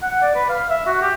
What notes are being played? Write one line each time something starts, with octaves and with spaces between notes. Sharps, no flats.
F#5
D5
B4
F5
E5
F#4
G4